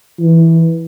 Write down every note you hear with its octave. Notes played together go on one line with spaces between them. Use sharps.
E3